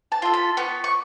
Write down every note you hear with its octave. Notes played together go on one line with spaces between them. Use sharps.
A5
F4 A4
B5
B3 C#6
C#6